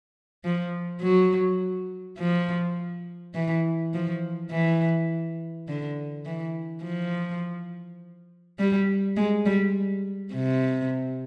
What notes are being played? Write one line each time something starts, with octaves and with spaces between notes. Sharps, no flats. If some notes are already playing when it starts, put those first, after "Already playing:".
F3
F#3
F3
E3
F3
E3
D3
E3
F3
G3
G#3
G3
C3